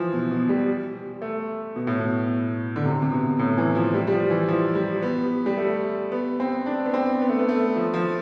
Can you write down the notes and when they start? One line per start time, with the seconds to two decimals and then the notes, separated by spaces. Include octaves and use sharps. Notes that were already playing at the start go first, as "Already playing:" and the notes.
Already playing: E3 F3
0.13 B2
0.31 B2
0.49 G3
1.22 A3
1.76 B2
1.87 A2
1.99 B2
2.76 D3
2.85 C3
3.02 C3
3.12 B2
3.39 A2
3.58 E3
3.75 F3
3.94 G3
4.07 G3
4.12 F3
4.30 E3
4.48 F3
4.75 G3
5.02 B3
5.46 G3
5.57 A3
6.12 B3
6.40 C4
6.66 D4
6.86 B3
6.94 C4
7.22 B3
7.29 A3
7.39 B3
7.49 A3
7.76 F3
7.94 F3